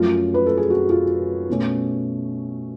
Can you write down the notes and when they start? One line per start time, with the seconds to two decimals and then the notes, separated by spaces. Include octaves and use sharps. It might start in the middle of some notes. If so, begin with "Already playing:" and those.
Already playing: F#2 F3 A3 C#4 F4
0.34 B4
0.46 A4
0.57 G#4
0.70 F#4
0.89 F4
1.50 B2 A3 C#4